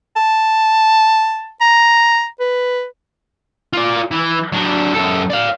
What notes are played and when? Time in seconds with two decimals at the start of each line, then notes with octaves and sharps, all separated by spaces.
0.16 A5
1.61 A#5
2.40 B4
3.73 F4 D5
4.11 E3
4.52 F#3 D4
4.94 F#2 A4
5.30 D5 F5